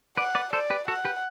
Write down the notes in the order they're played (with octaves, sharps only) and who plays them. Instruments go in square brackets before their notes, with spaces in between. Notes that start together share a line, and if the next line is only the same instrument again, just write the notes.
[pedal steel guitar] B4 D5 [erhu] F#5
[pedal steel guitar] B4 D5
[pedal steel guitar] A4 C5 [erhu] D5
[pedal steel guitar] G4 B4
[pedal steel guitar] F#4 A4 [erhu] F#5
[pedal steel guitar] G4 B4